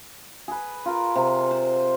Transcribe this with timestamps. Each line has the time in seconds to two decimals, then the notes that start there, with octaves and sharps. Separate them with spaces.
0.48 G#4 B4
0.86 F4 A#4
1.16 C3
1.51 C5